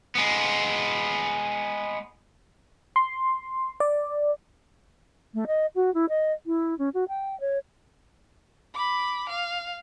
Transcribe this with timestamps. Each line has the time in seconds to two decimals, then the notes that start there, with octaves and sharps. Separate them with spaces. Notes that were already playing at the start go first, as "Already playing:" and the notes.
0.15 G#3 B3
2.96 C6
3.80 D5
5.34 A3
5.47 D#5
5.75 F#4
5.94 E4
6.09 D#5
6.46 E4
6.79 C#4
6.94 F#4
7.08 G5
7.40 C#5
8.74 B5 D6
9.29 F5